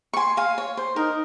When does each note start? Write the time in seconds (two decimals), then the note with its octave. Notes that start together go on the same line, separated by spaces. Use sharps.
0.14 C#6
0.17 G#5 C6
0.37 F5 G#5
0.58 C#5
0.77 C5
0.96 D#4 A#4